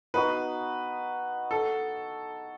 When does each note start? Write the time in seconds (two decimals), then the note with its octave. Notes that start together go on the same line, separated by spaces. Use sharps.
0.14 B3 D#4 F#4 B4
1.51 A4